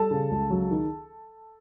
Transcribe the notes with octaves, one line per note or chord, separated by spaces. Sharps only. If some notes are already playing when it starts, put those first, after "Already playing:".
Already playing: G3 A4 A5
C#3
C#2
F#3
D#3